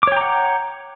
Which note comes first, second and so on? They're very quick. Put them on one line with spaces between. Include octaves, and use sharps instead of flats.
D6 C#5 G5 A#5 F#5